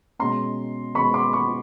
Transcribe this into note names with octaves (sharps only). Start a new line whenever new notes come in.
B2 G#3 C#4 A#5 C6
B2 G#3 C#4 B5 C#6
C6 D6
B5 C#6